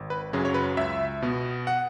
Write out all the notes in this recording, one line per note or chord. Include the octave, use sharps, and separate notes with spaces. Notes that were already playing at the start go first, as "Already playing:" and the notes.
Already playing: G#1
B4
F#2 C#3 F#3 C#4 G#4
C#5
B4
C#2 E5
B2 B3
F#5